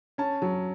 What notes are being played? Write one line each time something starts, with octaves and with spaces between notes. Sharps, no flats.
C#4 A5
F#3